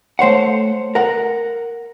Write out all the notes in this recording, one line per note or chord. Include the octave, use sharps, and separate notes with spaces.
A3 C5 C#5 F#5
A#4 F#5